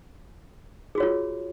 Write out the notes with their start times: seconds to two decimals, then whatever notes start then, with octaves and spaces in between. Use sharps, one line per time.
0.95 G#4
0.98 F#4
1.00 C#5
1.03 F4